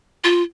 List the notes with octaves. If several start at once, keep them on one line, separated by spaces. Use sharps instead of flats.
F4